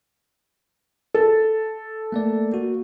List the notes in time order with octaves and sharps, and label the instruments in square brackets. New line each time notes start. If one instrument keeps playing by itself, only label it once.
[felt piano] A4
[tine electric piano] A3 A#3 D5
A#3 F#4